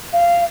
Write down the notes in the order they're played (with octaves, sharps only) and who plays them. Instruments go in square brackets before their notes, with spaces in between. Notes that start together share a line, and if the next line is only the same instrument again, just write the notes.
[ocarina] F5